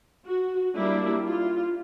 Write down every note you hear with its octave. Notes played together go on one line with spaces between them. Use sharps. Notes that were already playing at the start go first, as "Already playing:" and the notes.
F#4
G3 A#3 D4 E4
F4